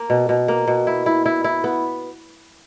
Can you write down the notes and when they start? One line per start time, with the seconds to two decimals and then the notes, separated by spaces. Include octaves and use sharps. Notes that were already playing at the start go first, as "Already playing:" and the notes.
Already playing: A#3
0.10 B2
0.29 B2
0.48 A#3
0.68 B2
0.87 E4
1.06 E4
1.26 E4
1.44 E4
1.64 B3